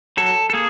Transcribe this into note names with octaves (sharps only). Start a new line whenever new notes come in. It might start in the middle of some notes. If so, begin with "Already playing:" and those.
F#3 A4
A4
A#3 G#4